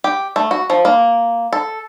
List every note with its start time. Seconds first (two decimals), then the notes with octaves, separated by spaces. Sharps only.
0.04 G4
0.36 A3
0.51 F#4
0.70 F3
0.85 A#3
1.53 A4